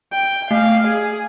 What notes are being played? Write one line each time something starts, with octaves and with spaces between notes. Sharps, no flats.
G5
A3 F5
G#4